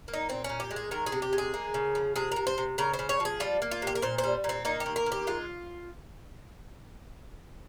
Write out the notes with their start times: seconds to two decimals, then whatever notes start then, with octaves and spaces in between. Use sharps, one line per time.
0.08 A#3
0.13 D#4
0.29 A#2 C4
0.44 A#2 C#4
0.60 G4
0.71 G#3
0.76 G#4
0.91 D#3 A#4
1.06 G#4
1.12 C3
1.22 G4
1.33 G#3
1.38 G#4
1.54 A#3
1.74 C#3
1.95 F3
2.16 C3 G#4
2.32 C3 A#4
2.47 C5
2.58 C3
2.78 C#3 A#4
2.94 C5
2.99 C#3
3.09 C#5
3.20 F3
3.25 G#4
3.40 G3 F4
3.62 A#3
3.71 F4
3.82 C3 G4
3.95 A#4
4.02 A#2 C5
4.18 C5
4.24 G3
4.44 A#2
4.49 C4
4.65 A#3 D#4
4.80 G4
4.86 D#3
4.96 A#4
5.06 A#3
5.12 G4
5.27 G#3 F4